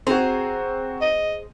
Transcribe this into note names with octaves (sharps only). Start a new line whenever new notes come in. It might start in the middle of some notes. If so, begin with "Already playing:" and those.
C4 F#4 G#4 C5 A#5
D#5